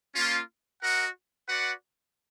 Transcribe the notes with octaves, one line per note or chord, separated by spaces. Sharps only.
A#3 C#4 F4
F#4 A#4 D#5 F#5
F#4 B4 D5 F#5